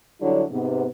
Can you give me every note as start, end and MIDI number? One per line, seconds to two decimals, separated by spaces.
0.20 0.43 50
0.20 0.43 54
0.20 0.43 55
0.20 0.43 62
0.20 0.43 64
0.20 0.43 73
0.51 0.85 44
0.51 0.85 48
0.51 0.85 59